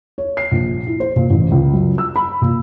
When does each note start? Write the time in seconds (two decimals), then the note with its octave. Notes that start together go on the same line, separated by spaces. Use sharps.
0.18 C#5
0.37 C7
0.51 A#1
0.87 E4
1.00 C5
1.16 A#2
1.30 A1
1.51 C#2
1.74 F#2
1.98 E6
2.16 B5
2.42 A#2